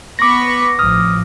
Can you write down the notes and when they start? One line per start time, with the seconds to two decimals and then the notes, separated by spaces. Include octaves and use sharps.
0.19 B3 B5 C#6 D6 A#6
0.79 A1 F3 D#6 F6